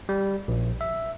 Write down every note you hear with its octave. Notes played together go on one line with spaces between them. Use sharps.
G3
A#1
E5